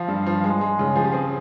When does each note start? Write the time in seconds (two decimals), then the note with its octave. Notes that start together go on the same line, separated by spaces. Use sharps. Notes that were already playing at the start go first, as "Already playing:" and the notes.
Already playing: F3 F5
0.08 G2
0.27 F3
0.44 G#3
0.61 G#3
0.79 C#3
0.96 F3 G#4
1.04 G4
1.12 C4 G#4